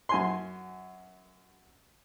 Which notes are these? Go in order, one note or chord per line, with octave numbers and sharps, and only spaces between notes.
F#2 G#5 C6